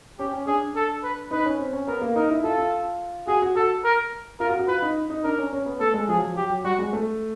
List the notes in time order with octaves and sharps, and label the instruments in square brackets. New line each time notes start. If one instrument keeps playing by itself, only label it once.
[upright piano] C#4 [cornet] G4
[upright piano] C#4
[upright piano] D4 [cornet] G#4
[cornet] A4
B4
[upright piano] D#4 [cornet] B4
[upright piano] C#4
C4
C#4
[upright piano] B3 [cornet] A#4
[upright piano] A#3
[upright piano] D#4 [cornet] A#4
[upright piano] E4
[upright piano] F4 [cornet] A4
[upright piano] F4
[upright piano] F#4 [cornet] G#4
[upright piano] F#4
[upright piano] F#4 [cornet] A4
[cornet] A#4
[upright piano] F4 [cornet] A#4
[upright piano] F#4
F#4
[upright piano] F4 [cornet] B4
[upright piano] D#4
D#4
[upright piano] D4 [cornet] A#4
[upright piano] C#4
C#4
B3
[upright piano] A3 [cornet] A4
[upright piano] G#3
[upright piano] F3 [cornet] G#4
[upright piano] F#3
F3
[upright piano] F#3 [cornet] G4
[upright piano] F#3
[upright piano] G3 [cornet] F#4
[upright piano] G#3
A3